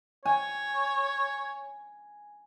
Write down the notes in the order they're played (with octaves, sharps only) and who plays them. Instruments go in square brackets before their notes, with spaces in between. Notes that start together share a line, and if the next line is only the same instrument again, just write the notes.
[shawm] C#5 [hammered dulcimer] G#5